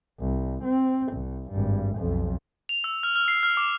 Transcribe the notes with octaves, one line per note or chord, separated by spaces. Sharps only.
C2
C4
C2
G#1 G2
B1 F2
F7
E6
F6
F6
C7
F6
D6